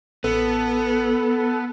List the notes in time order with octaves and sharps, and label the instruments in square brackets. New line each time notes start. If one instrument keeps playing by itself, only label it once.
[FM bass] A1 [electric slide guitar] B3 [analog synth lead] A4